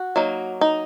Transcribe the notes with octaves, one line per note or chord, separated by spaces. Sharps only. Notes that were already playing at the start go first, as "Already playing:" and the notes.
Already playing: F#4
F#3 A#3 D#4
D#4